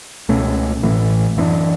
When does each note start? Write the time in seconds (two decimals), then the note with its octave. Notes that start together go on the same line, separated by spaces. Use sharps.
0.29 C#2 B2 A3 C#4
0.83 A1 A2 E3 A3
1.37 F#2 E3 B3 D4